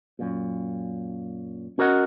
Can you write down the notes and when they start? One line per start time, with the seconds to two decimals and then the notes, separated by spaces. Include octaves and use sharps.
0.19 F#2 A#2
1.78 C#4 F#4 A#4 D#5 F#5